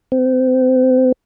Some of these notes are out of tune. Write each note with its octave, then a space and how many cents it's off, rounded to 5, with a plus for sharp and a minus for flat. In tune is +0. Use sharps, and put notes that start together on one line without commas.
C4 -30